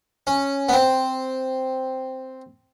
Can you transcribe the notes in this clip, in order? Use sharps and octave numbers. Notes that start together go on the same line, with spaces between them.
C#4
B3
C4